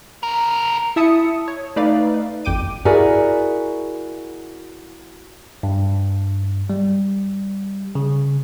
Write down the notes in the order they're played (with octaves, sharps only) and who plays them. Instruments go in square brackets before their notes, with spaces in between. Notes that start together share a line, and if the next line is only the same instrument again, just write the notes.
[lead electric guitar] C#3 A#4
[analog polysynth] E4 E5 A5 D#6 C#7
C#5
A3 D#4 B4 D5 F5
G#1 F2 G5 D6 D#7
[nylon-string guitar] E4 F#4 G#4 A#4 D5
[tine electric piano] G2
G3
C#3